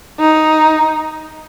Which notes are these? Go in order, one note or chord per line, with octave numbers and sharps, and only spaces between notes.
D#4